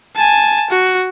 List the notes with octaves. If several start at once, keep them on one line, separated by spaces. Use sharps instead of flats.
G#5 A5
F#4